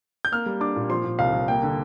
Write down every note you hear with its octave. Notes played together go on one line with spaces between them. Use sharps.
G6
A#3 F6
G3
D4 D6
A#2
F3 C6
A#2
C2 F5
C2
A#3 G5
D3